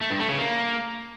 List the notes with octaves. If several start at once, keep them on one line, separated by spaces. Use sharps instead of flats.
A3
G2
A3
C#3
A#3